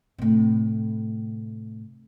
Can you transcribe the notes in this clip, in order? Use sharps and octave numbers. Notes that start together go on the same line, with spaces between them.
A2 C3